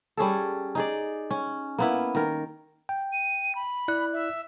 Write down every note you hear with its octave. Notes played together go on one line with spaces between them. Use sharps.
G3 C#4 G#4 A4
D#4 G#4 D5
C#4
A#3 B3 E4
D#3 A#4
G5
D#7
B5
E4 D5 F#6
E5